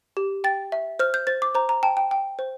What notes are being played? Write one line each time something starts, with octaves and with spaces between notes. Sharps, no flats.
G4
G5 A6
E5
C5 F6
G6
C5 A6
D6
C5 A#5
A#5
G5 A5
G5
G5
C5